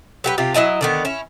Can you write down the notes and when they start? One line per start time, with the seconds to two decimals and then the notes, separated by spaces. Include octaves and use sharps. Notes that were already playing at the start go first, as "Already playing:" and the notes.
0.24 F#3 G4 B4
0.38 C3 F4 G4
0.54 F#3 E4 D#5 G#5
0.81 D3 D#3 B3
1.05 C#4 E4